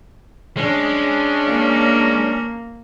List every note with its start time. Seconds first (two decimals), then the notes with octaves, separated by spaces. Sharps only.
0.57 G#3 C#4 D4
1.49 A#3